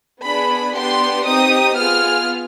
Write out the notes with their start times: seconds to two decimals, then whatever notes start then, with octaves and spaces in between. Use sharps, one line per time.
0.24 B3 D4 G#4 B5
0.75 B3 D4 G4 C6
1.26 C4 D#4 G4 D#6
1.77 B3 F4 G#4 F6